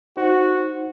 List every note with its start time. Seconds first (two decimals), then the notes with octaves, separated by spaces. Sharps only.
0.17 D#4 F#4 C5